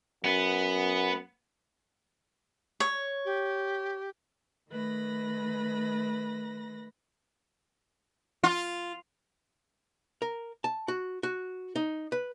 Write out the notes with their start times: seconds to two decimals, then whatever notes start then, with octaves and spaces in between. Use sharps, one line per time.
0.24 F#2 B3
2.80 C#5
3.24 G4
4.69 D#3 A3 B4 B5 A#6
8.44 F4
10.22 A#4
10.64 A5
10.88 F#4
11.23 F#4
11.76 D#4
12.12 B4